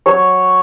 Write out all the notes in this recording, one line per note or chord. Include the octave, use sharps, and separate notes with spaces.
F#3 C#5